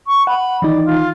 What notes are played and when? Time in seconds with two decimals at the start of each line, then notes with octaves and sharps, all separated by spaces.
0.07 C#6
0.27 F#5 B5
0.62 D#3 E3 D#4 D5
0.86 F4